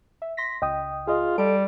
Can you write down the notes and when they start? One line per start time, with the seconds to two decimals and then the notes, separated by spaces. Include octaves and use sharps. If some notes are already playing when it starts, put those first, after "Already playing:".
0.22 E5
0.37 C6 A#6 B6
0.62 C#2 D#5 G5 D#6
1.07 F4 G#4 D#5
1.38 G3 A4 D7